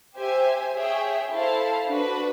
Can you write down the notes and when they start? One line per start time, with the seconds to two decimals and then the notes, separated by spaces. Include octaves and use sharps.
0.17 G4 C5 E5 G#5
0.74 G#4 C#5 E5 G5
1.31 E4 A4 C5 F5 A5
1.88 D4 F#4 B4